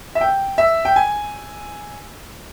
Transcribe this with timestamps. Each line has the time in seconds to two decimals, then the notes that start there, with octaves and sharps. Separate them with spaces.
0.15 E5
0.21 G5
0.58 E5
0.85 G5
0.96 G#5